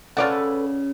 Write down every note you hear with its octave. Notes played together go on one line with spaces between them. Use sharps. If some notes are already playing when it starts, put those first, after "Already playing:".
C#3 F4 A4 B4 C#5 D5 F#5